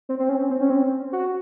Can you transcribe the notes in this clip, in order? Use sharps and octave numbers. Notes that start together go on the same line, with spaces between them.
C4
C4
C#4
C4
C#4
C4
F#4